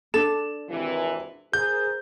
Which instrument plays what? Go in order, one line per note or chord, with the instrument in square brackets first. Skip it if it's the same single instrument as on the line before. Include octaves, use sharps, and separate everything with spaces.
[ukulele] D4 A4 [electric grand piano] E7
[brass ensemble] G#1 C3 E3
[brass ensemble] G#4 A#4 C5 [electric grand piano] G6